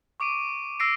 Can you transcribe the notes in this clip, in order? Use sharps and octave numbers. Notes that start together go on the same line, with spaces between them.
C#6 D6 D7 D#7
E6 A#6 C7 D7